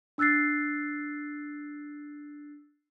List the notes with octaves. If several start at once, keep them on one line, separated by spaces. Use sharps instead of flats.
D4 E6 F#6 A6 C7